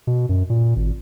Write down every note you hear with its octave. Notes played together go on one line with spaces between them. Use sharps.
B2
F#2
A#2
G#1